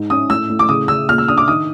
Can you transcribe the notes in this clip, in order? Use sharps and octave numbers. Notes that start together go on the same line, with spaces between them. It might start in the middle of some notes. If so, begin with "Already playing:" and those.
Already playing: G#2
C#4 D#6
A2 E6
A2
D6
C#3 D#6
C#3 E6
A#2 F6
E6
D4 D#6
D6
D#3 D#6